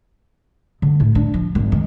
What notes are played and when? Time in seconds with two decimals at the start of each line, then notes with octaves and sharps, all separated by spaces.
0.82 D3
1.00 A2
1.15 D4
1.34 F3
1.55 G#1
1.72 D#3